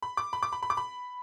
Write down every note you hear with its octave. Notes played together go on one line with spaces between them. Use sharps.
B5
D6
B5
D6
B5
B5
D6
B5